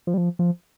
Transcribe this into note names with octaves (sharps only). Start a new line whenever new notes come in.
F3
G3
F3
F3